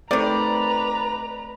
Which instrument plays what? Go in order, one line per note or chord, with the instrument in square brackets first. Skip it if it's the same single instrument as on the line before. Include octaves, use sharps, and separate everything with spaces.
[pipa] C3 D#3 [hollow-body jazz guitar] A3 C4 [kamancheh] B4 A#5 [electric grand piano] D5